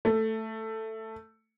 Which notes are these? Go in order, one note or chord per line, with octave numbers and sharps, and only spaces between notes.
A3